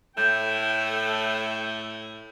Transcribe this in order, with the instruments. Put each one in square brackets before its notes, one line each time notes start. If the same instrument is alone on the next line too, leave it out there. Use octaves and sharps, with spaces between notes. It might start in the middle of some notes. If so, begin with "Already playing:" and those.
[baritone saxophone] A2 [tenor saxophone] A3 [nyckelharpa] G5 [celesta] G6